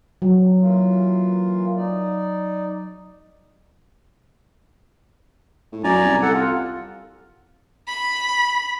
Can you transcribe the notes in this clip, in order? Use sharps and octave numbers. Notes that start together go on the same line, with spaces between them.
F#3
E3 A#3 F4
D#4 D5
A2
F#2 D5 G#5 A#5
C2
A4 F#5
F4
B5